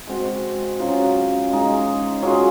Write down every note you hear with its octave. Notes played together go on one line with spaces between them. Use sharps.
G#3 C4 F#4
F#3 C#4 F4 G#4
G#3 D#4 G#4
F#3 C#4 F4 G#4